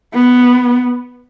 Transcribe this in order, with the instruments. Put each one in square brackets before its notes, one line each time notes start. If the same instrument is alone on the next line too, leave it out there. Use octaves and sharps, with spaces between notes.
[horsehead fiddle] B3